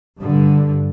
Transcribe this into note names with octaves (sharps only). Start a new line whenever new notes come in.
G2 D3